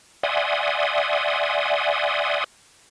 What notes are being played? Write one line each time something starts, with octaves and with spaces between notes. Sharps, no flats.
D5 E5 F#5 G#5 C6 D#6